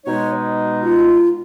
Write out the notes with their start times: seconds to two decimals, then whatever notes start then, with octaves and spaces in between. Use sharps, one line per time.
0.06 B2 G#3 D#4 C#5
0.82 F4